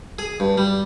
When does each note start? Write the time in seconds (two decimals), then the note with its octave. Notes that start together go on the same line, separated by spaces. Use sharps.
0.19 G#4
0.40 G2
0.58 G3